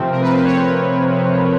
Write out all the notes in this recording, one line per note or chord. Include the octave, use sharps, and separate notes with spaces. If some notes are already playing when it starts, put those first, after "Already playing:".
Already playing: C3 F3 A3 C4
A#4
B4
C5
C#5